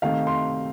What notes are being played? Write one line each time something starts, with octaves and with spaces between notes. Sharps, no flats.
C3 D#3 A3 F5
C6